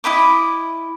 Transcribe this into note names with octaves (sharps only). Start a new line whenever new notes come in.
E4 D#5 B5 D6